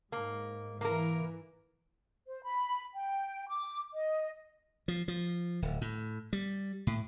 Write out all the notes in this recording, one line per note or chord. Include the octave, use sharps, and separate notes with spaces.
G#2 A#3
E3 A#3 A#4
C5
B5
G5
D6
D#5
F3
F3
D1
A2
G3
A2